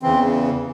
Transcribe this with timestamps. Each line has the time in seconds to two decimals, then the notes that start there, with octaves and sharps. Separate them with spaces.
0.02 E2 C#3 E3 C4